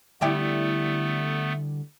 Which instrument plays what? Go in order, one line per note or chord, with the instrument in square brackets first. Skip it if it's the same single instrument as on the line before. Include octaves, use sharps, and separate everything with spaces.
[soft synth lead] D3 [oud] G3 E4 G4 [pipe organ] A3 B3